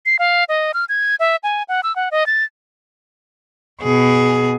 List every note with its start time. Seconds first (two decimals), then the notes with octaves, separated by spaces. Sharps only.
0.06 C7
0.19 F5
0.49 D#5
0.74 F6
0.89 G#6
1.20 E5
1.43 G#5
1.69 F#5
1.83 E6
1.96 F#5
2.11 D#5
2.26 A6
3.82 B2 G#4